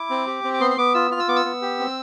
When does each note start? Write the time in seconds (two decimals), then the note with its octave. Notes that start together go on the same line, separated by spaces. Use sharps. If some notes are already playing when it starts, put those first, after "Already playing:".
Already playing: E4 D6
0.10 C4
0.27 G4
0.44 C4
0.54 D6
0.60 B3 C6
0.71 C6
0.78 B3 D6
0.94 F4 E6
1.11 F4 F6
1.20 E6
1.28 B3 D6
1.36 E6
1.45 B3
1.62 G4
1.79 C4